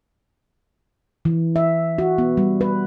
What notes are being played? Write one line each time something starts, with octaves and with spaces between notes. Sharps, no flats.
E3
E5
F#4
B3
G3
B4